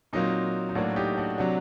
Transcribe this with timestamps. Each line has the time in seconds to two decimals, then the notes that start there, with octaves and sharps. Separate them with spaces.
0.13 A#2 F#3 A#3 C4 D#4
0.69 D#4
0.75 A2 F#3 A#3 D4 F#4
0.96 D#4 G4
1.17 D4 F#4
1.38 C3 F#3 D4 F#4